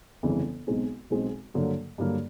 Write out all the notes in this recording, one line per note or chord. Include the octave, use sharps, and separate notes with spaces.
G1 F2 C#3 E3
B1 B2 G#3 C4 D#4
B1 B2 G#3 C4 D#4
G2 D3 F#3 A#3
G2 D3 F#3 A#3